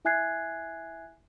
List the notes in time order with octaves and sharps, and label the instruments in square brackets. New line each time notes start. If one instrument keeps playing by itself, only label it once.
[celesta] E4 E5 G#5 F#6 G#6 C7